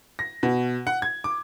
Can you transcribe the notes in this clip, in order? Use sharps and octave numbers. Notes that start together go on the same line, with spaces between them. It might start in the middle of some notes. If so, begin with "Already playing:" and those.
A#6
B2
F#5
G#6
D6